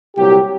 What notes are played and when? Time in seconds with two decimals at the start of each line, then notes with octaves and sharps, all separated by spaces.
0.17 C2 A#2 F#3 G4